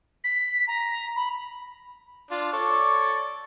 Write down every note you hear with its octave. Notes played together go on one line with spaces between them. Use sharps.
B6
A#5
B5
D4 F4
A4 C#5 D5